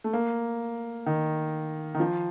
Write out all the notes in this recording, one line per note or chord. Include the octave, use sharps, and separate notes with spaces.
A3
A#3
D#3
D#3
F3